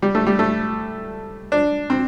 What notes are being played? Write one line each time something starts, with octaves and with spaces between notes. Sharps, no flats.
G3
A3
G3
A3
D4
C4